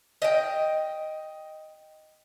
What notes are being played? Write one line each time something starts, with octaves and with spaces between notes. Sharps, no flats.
D#5 G5